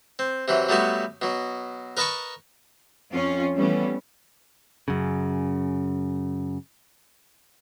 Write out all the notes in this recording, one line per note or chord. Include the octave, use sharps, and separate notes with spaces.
C4
C3 E3 F#3
F#3 G3 A3 B3 F#4
B2 F#3
A#4 B4 D#5 A5 B5 C#6
F2 C#4 F4
E3 G3 A3 B3 C#4
F#2 C#3